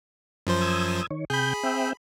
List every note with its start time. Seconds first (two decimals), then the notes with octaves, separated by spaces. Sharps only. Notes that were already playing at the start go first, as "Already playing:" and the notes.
0.47 F#2 F3 C5
0.61 D#6 E6 G#6
1.11 D#3 C#5
1.30 C3 G#4 G5 B5 G6
1.63 C4 E5 G5